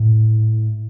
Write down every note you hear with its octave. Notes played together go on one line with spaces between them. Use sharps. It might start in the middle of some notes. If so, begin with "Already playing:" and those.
Already playing: A2